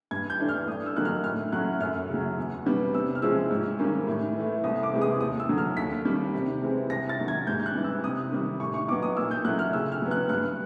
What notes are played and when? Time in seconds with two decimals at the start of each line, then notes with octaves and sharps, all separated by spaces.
0.11 G2 G#6
0.30 G6
0.39 E3 A3 D4
0.49 F6
0.68 G2 D#6
0.86 E6
0.96 D3 F#3 A#3 D#4 F#6
1.05 F6
1.24 A2 F6
1.52 F#3 A3 C#4 F#6
1.80 F#2 F6
2.09 C#3 F#3
2.38 E2
2.66 B2 G3 B3
2.94 C3 E6
3.15 F6
3.22 F3 G#3 C#4 E4 E6
3.51 G#2
3.79 D#3 G3 A#3 C#4
4.07 A2
4.36 E3 A3
4.64 C2 D#6
4.83 D6
4.92 C3 E3 G#3
5.02 D#6
5.20 D#2 D#6
5.40 E6
5.49 D3 F#3
5.58 F6
5.77 D#2 B6
6.05 D#3 G3
6.34 C3
6.62 E3 G#3 C4
6.90 C2 A#6
7.09 A6
7.19 C3 D#3 F#3
7.28 G#6
7.47 G#2 G6
7.59 G6
7.66 F#6
7.75 E3 G3
7.84 E6
8.03 C3 D#6
8.32 D#3 G3
8.60 A2 C#6
8.74 C#6
8.88 F#3 B3 D#4 D6
9.02 D#6
9.17 A#2 E6
9.31 G6
9.45 F#3 A3 C#4 E4 F#6
9.59 F6
9.73 C#3 E6
9.92 F6
10.02 F#3 B3
10.11 F#6
10.29 G2 F#6